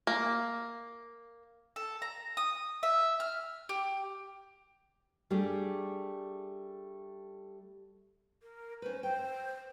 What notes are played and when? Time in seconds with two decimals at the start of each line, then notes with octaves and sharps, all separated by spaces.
0.07 A#3
1.76 A4
2.02 A#5
2.37 D#6
2.83 E5
3.20 F6
3.69 G4
5.30 G3 A3 D4 G4 G#4 D5
8.42 A#4
8.82 C#4 B4 C5
9.03 C5 G5